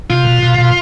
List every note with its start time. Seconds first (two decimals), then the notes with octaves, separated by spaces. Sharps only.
0.10 C3 F4
0.26 B2
0.43 B2
0.58 B2